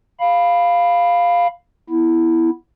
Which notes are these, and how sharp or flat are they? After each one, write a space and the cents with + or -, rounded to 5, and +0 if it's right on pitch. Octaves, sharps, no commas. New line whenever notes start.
F5 +0 B5 +0
B3 +0 E4 +0